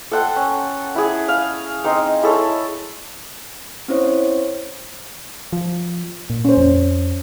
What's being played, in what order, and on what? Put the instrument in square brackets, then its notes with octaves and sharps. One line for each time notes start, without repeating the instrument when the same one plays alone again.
[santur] A4 C5 F#5 G5
C#4
E4 G#4
F5
C4 D#4 C5 D#5
E4 G#4 A4 C#5
[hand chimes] C4 C#4 E4 C5 C#5
[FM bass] F3
A#2
[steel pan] C#4 C5
[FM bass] F2